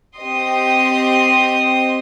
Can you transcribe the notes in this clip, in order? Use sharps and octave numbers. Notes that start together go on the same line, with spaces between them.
C4 G4 D#5 C6 D#6